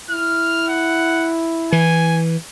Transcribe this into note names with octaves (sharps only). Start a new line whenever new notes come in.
E4 F6
F#5
E3 G#5